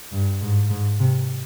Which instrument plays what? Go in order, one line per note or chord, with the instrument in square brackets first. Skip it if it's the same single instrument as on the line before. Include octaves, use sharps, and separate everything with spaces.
[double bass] G2
G#2
G#2
C3